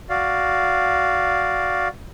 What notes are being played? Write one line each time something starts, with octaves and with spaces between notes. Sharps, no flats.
F#4 D5 F5